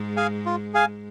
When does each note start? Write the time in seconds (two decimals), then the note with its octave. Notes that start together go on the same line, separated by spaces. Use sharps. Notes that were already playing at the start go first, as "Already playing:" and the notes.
Already playing: G#2 G#3
0.17 G#4 F5 G#5
0.46 F4
0.74 G#4 F5 G#5